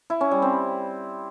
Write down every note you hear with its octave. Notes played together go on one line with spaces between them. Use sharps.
E4
C#4
G3
C4